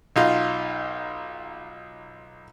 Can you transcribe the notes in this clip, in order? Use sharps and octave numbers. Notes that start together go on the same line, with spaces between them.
B1 D#4 F4